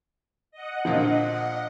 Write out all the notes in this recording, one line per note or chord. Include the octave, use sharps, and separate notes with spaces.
D#5 F#5
A#2 D3 F3